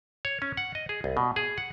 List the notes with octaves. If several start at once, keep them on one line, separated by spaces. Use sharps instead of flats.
C#5
C#4
F#5
D#5
G#4
C2
B2
G#4
F#5